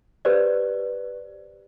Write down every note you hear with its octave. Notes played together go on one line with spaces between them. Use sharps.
G4 B4 C5 D5